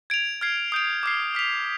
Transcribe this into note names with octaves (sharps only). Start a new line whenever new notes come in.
G#6 D7 F7
F6 G#6 C7
D#6 G6 D7 F7
D6 F6 C7
F6 B6 F7